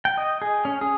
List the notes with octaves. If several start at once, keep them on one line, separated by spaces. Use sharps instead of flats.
G5
D#5
G#4
C#4
G#4